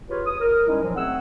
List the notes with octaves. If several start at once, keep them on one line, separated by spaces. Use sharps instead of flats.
F4 G4 G#4 B4 C#5
D#6
A#4
G3 G#3 C#4 D#4 E4
A#2 F3 F#3
A3 C4 G#4 F#5 E6